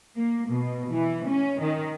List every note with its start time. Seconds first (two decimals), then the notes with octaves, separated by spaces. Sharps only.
0.16 A#3
0.50 B2
0.89 E3
1.28 C#4
1.61 D#3